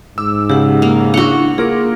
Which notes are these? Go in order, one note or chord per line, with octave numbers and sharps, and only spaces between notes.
G#2 D6 E6
C#3 G4 F#5
A#3
D4 E4 F#4 F#5
A#3 F4 G#4 A#4 D6